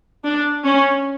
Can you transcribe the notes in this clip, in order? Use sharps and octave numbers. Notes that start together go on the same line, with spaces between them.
D4
C#4